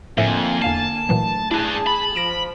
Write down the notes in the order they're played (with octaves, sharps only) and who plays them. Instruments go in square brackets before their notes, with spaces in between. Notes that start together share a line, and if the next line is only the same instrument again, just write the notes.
[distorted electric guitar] F2 [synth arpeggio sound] A2 F3 E5 [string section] D3 A#3 G#5
[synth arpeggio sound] E2 F5 C7 [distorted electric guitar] A5
[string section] D2 [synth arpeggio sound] A#2 E3 F#3
[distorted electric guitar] D4 B4 [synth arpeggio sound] E4 [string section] G#4 A5
[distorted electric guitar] B5
[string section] F3 [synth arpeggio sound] A#6 D7 E7